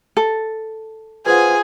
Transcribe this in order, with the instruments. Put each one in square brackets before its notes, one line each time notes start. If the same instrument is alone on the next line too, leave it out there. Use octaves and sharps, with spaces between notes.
[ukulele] A4
[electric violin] F4 G#5 [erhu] G#4 [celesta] B4 C5 F#5